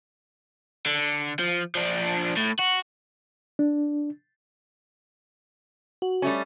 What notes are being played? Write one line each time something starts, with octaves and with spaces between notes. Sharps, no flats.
D3
F3
F3 D4
A2
F#4
D4
F#4
G3 A3 C#4